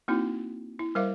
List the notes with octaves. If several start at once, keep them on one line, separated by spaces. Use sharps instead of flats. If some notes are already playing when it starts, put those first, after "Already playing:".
A#3 C4 D#4 E4 F#4
E4
G3 A#4 C5 E5 F5 D6